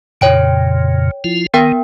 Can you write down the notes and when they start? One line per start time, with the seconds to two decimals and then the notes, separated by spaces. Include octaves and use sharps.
0.21 F2 A#2 C#3 C#5 G5 D7
1.24 F3 E4 F4
1.54 D#3 B3 A#4 G5